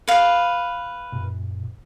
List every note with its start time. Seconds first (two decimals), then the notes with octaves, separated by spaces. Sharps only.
0.08 B4 F5
1.12 F#2 A#2